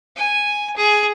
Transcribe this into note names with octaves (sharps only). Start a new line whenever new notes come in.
G#5
G#4